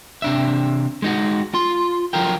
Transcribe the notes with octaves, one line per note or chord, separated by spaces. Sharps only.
C3 D4 E5
G#3 D#4 F#4
F4 C6
F3 F#3 F4 A#4 G5